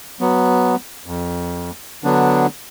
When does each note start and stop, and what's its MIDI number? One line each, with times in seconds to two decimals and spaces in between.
0.20 0.76 54
0.20 0.76 59
1.06 1.70 41
2.04 2.46 50
2.04 2.46 54
2.04 2.46 59
2.04 2.46 62